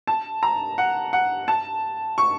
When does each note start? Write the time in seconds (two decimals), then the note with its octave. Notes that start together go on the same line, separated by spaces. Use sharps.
0.07 A5
0.43 A#5
0.78 F#5
1.13 F#5
1.48 A5
2.18 C#6